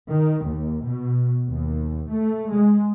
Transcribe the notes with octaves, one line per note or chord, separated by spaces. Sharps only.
D#3
D#2
B2
D#2
A3
G#3